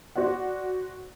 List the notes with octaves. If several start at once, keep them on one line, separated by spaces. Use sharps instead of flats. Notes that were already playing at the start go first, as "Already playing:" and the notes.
F#4 C5 D5 F#5